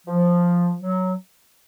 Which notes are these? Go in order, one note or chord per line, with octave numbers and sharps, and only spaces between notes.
F3
F#3